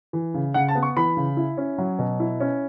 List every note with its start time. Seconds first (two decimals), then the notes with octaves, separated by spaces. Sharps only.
0.13 E3
0.34 C#3
0.54 C#3 F#5
0.68 A5
0.75 B3
0.83 C#6
0.96 E3 B5
1.17 C#3
1.37 E4
1.57 C#4
1.78 F#3
1.99 B2
2.20 E4
2.40 C#4